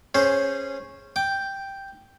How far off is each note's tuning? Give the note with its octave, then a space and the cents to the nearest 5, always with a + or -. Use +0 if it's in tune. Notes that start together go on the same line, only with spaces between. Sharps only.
C#4 -15 G#4 +0 C5 +0
G5 +0 D6 +0